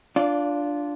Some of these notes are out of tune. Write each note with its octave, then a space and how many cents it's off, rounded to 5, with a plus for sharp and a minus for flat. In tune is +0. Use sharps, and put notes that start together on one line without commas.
D4 +0 F4 +0 D5 -25